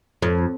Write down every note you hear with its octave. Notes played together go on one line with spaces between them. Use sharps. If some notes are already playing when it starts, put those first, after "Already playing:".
F2